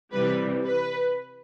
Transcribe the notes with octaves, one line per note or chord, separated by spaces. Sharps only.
C3 E3 G3 B4
B4